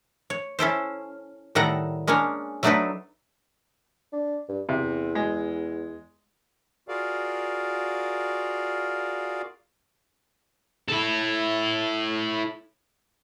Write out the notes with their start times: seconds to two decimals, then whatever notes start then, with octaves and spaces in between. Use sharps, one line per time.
0.30 C#5
0.59 C#4 E4 A4 C5
1.55 A2 D#3 G3 A4 F#5 A#5
2.07 G#3 A#3 C#4 D4 C#5
2.63 F#3 A3 D4 D#4 A4 B4
4.13 D4
4.49 G2
4.69 E2 C3
5.15 G#3
6.88 F4 F#4 G#4 A#4 D5 F5
10.89 E4 A4